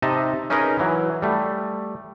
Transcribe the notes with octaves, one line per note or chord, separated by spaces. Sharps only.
C3 D#4 D#5 E5 A5
C#4 D#4 G#4 A#4 B4 D#5
E3 F#3
G3 A3